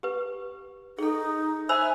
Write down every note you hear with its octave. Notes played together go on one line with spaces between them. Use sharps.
G4 B4
D#4 G#4 A4
C5 E5 G#5 B5 E6